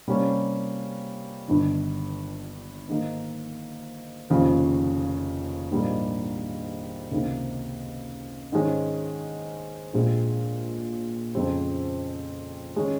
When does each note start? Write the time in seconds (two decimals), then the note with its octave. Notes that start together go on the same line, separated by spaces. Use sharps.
0.08 C3 G3 A#3 C#4
1.48 G1 G2 D#3
2.89 G#2 D#3 A#3 D#4
4.30 F1 D#2 C#3 F3
5.72 A#1 G#2 G3 A#3 D#4
7.12 C#2 C3 D#3 A#3 D#4
8.52 G#2 D#3 G#3 C#4
9.93 A#1 A#2 G#3 C4
11.35 F2 C#3 G#3 C4
12.76 D#3 G#3 C#4